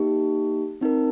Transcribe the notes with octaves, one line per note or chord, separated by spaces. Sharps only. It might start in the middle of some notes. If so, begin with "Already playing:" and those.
Already playing: A#3 D#4 G4
C4 D#4 A#4